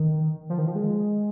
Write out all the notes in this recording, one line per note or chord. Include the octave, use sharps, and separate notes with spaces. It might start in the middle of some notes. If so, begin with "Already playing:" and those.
Already playing: D#3
F3
D#3
F3
G#3